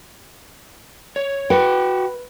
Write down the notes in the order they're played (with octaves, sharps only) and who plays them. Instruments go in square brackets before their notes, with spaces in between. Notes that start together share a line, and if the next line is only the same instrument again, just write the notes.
[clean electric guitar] C#5
[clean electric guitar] F#4 F#5 G5 [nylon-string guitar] B4